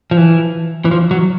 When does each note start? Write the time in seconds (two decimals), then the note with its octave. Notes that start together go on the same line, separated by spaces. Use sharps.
0.11 F3
0.17 E3
0.85 E3
0.91 F3
1.11 F#3